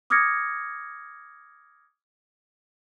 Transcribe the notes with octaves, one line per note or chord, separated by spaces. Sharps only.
D6 D#6 F6 G#6 A#6 C#7